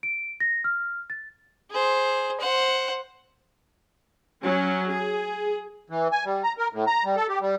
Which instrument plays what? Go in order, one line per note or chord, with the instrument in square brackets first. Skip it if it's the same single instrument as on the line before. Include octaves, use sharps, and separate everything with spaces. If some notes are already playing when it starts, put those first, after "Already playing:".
[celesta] D7
A#6
F6
A6
[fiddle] G#4 C5
C5 F#5
[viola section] F#3 C#4
G#4
[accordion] E3
G#5
G3
A#5
A#4
A2
A#5
G3
A4
G4
G3